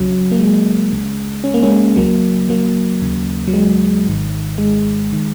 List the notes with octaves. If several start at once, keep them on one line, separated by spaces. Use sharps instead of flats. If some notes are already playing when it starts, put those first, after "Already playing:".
Already playing: C#2 C#3 F#3
A#3
G#3
C#2 C#3
C#4
A#3
G#3 C#4
C#2 C#3 F#3 A#3
F#3 A#3
D#2 C#3
F#3
G#3
G#1 G#2 D#3
G#3
D#3